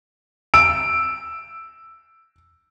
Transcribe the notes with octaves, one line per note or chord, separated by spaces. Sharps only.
E6 D7